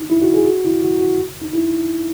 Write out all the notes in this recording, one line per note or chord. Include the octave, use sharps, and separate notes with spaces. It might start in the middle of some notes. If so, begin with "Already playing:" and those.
Already playing: D#4
E4
F#4
G#4
F#4
E4
F#4
F#4
D#4
E4